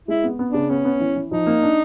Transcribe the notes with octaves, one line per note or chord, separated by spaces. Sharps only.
G#3 E4
B3
B3
C#3 D4
B3 C#4
B3
E3
E3
F3 D#4
A#3
D4